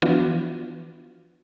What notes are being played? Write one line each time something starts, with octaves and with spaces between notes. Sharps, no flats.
E3 F3 B3 D4 F4 F#4